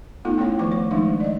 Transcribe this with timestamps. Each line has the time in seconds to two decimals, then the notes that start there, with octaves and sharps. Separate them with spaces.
0.25 A3 B3 D#4 F4 A4
0.38 B3 C#4 E4 F4 C#5 G5
0.59 D#3 F3 A3 C#6 D6
0.72 C#5
0.91 D#3 F3 G#3 A3 D4 D#4
1.20 D5 D#5